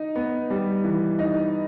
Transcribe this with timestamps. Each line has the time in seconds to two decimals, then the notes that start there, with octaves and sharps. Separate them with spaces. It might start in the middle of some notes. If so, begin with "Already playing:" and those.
Already playing: D#4
0.16 B3
0.50 G3
0.84 E3
1.19 D#4